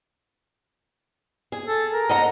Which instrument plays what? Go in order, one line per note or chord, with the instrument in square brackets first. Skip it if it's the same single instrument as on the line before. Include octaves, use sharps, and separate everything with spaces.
[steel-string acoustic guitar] G#4
[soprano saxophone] A4
A#4
[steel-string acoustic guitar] D#5 F#5 A#5